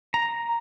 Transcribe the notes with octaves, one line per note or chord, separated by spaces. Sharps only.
A#5